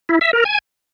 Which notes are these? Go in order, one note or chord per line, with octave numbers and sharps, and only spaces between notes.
E4
E5
A#4
G#5